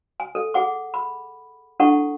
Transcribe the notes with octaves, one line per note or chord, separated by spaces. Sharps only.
G#5
A4
G#4 F#5 D6
B5
D4 E4 A4 F#5 C#6